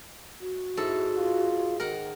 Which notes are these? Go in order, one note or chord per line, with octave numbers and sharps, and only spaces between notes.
F#4
G#2 E4 A4
F4
D#3 A#4 F#5